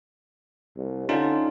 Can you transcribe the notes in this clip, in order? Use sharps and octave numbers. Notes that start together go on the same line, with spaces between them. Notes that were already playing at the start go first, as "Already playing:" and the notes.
C2
D3 C#4 D#4 F4